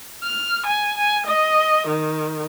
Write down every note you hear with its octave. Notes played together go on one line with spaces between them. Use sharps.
F6
G#5
G#5
D#5
D#3